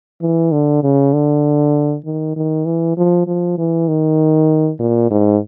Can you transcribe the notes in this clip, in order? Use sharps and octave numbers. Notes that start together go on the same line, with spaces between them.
E3
D3
C#3
D3
D#3
D#3
E3
F3
F3
E3
D#3
A#2
G#2